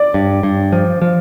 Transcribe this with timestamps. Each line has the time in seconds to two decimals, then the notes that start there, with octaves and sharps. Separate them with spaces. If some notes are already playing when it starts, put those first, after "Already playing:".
Already playing: D5
0.14 G2
0.43 G2
0.72 F3
1.02 F3